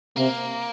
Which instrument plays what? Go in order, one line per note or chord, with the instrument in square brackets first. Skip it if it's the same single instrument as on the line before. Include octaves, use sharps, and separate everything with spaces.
[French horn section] C3 [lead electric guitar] A#3